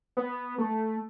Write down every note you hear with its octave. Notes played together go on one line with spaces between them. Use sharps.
B3
A3